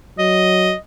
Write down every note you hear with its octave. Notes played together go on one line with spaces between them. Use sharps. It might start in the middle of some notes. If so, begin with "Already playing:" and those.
F#3 D#5